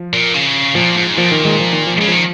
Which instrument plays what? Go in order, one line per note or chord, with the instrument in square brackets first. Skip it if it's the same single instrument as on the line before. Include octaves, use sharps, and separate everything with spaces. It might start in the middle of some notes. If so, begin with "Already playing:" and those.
Already playing: [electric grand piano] F3
[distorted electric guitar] A#2
C#3
[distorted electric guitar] A#2 [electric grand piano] F3
[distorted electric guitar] G#2
[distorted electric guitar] A#2 [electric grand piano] F3
[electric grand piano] D#3
D#3 G#3
F3
D#3
F3
[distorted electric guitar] C#3 [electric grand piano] G#3
[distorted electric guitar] D#3 [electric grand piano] F3